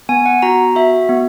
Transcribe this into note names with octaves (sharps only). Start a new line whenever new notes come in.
B3 G#5
F#5
F#4 A#5
F#4 E5
B3